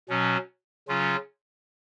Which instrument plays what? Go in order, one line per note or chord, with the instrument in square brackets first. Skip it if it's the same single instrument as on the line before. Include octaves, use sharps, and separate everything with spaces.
[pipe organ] B2 F#3 C#4
C#3 F#3 C#4 F4